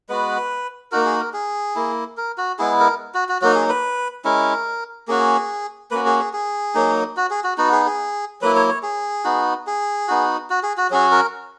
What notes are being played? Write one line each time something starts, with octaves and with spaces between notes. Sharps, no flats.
G#3 B3 F#4 B4
A#3 D#4 F#4 A#4
G#4
A#4
G#4
A#3 E4
A#4
F#4
G#3 B3 E4 G#4
A#4
F#4
F#4
F#3 A#3 D#4 F#4
G#4
B4
G#3 C#4 E4 A#4
A#3 C#4 F#4 G#4
A#3 C#4 F#4 B4
G#4
G#4
G#4
F#3 A#3 D#4
F#4
G#4
F#4
B3 D#4 F#4
G#4
G#4
F#3 A#3 E4 B4
C#5
C#5
G#4
B3 D#4 F#4
G#4
B3 D#4 F#4
F#4
G#4
F#4
F#3 C#4 F#4 G#4
A#4